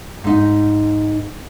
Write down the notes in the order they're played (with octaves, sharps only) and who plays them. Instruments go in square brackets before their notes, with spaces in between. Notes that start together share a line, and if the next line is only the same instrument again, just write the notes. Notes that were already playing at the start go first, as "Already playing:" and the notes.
[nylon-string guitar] G#2 D#4